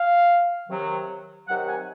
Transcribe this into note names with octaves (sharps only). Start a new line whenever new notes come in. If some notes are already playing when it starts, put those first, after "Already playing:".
Already playing: F5
C3 D#3 F#3
C3 D#3 F#3 F#5
G#5